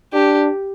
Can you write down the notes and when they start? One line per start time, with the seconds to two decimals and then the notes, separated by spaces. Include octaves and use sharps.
0.13 D4 G4